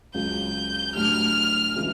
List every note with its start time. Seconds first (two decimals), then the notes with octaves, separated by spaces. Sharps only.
0.14 C#2 C#3 F#3 G6
0.94 A2 F#3 A3 D4 G4 F6
1.76 C#3 E3 G#3